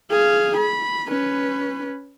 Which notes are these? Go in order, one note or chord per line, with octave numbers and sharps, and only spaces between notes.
G#4 F5
B5
C#4 B4